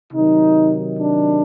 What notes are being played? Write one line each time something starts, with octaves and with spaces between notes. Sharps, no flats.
C3 D#3 F#3 D#4
D4